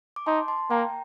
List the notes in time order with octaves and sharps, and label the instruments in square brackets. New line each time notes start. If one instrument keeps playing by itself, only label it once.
[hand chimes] D6
[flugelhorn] D#4 [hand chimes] A5 C6
[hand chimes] A5 C6
[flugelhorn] A#3 [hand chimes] G5 A#5